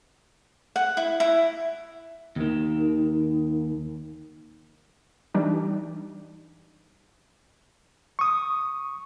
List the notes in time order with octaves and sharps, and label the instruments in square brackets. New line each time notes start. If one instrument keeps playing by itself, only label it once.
[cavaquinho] F#5
E4
E4
[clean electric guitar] D#2 D#3
[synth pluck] E3 G3 D4 D#4
[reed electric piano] C#6 D#6